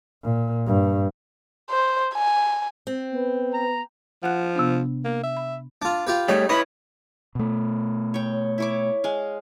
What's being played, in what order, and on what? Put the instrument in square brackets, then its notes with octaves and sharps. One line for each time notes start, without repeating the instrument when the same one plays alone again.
[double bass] A#2
G2
[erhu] C5
G#5
[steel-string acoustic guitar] C4
[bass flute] B3
[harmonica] A#5
[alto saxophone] F3 [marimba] F#5 F#6
[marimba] C3 B3 D4
[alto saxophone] A#3
E5
[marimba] B5
[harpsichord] D4 F4
F4 G4 B4
[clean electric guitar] G3 A3 [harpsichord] D#4 [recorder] C#5
[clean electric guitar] E4 B4 C#5 [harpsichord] D#5 [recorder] B5
[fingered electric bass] B2 A3
[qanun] C#5 G5
E4 C#5 D6
G#3 F5